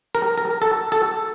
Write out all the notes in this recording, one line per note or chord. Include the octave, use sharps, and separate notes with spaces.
A#4
A#4
A4
A4